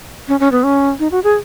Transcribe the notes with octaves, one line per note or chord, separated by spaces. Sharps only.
C#4
C#4
B3
C#4
D#4
F#4
G#4